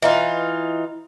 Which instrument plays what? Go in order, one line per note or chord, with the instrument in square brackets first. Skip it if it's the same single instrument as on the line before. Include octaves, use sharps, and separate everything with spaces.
[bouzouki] E3 D#4 F4